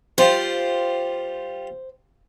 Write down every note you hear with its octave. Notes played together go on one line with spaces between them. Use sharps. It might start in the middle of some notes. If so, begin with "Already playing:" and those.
G3 F4 G4 C5